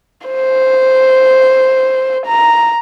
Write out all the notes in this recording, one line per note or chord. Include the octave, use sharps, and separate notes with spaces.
C5
A#5